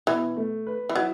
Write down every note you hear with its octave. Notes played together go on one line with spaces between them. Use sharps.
B2 E3
A3
B4
E3
F#3 E4